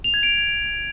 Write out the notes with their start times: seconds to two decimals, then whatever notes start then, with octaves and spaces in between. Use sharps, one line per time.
0.04 F7
0.14 G#6
0.23 D7